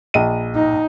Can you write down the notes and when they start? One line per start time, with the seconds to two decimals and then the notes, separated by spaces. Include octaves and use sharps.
0.14 A#1 D#5 D#7
0.55 D#4